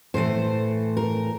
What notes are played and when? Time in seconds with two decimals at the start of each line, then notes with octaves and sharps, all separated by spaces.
0.14 A2 E3 A3 C5
0.97 A#4